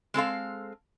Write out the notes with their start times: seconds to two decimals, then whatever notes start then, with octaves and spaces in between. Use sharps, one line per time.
0.14 G#3 C4 A4 F5